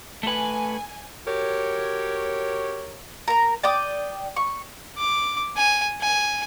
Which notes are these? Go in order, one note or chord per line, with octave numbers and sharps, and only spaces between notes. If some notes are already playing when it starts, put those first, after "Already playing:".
A3 B4 G#5
F#4 G4 A#4 C#5
A#4 A#5
D5 G5 D6 D#6
C#6
D6
G#5
G#5